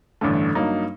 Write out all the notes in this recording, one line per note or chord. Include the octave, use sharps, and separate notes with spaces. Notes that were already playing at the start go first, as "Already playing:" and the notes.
A1 G2 D3 A3
G2 F#3 A#3 D#4